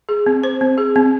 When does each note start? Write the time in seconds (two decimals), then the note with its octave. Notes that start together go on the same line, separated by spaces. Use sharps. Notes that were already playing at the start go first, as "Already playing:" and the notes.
0.09 G#4
0.26 C4
0.43 C5
0.61 C4
0.78 G#4
0.96 C4